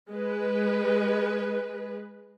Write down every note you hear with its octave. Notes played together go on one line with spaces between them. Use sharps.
G#3 B4